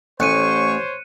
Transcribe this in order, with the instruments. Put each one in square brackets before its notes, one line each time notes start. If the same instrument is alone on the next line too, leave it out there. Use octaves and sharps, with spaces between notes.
[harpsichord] A1 [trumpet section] C5 C#5 [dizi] C#6 [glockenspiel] F#6 C#7 D#7